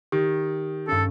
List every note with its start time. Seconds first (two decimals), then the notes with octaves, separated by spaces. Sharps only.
0.12 D#3 G4
0.88 G2 C#4 A4